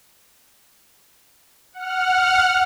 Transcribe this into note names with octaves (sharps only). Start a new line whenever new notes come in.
F#5 F6